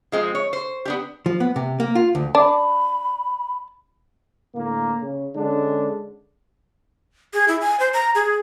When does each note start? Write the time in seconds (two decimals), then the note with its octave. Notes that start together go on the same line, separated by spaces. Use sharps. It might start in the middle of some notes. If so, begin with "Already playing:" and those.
0.12 F3 G#3 C4
0.35 C#5
0.53 C5
0.85 B3 D4 G4
1.26 F3
1.40 B3
1.56 C3
1.80 A#3
1.95 F4
2.15 D2
2.35 D4 B5
4.55 A2 D3 A#3
5.02 C#3
5.36 D3 G#3 C#4 D4
7.33 G#4
7.48 E4
7.61 G#5
7.80 C5
7.94 A#5
8.15 G#4